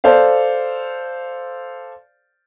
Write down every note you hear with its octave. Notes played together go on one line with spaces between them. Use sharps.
A4 C5 D5 F5